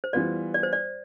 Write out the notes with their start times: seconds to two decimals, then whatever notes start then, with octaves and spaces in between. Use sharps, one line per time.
0.04 C5
0.13 E3 G3 B3 F4 B4 D5
0.54 D5
0.63 C5
0.73 D5